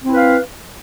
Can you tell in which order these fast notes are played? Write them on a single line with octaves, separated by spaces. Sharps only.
C4 E4 B4 F5